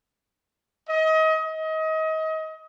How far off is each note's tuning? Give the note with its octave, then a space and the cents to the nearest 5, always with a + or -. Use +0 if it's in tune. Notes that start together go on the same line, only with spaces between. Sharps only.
D#5 +30
D#5 +30